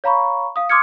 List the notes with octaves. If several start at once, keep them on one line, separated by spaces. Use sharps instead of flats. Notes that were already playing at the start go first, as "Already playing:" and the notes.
C#5 F5 A#5 B5 C#6
F5 D#6
C6 D6 D#6 F6 G#6 C#7